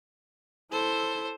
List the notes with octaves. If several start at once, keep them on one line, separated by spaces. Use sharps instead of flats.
E4 A4 C5